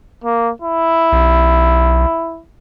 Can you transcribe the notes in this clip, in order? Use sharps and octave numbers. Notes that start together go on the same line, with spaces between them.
A#3
E4
B1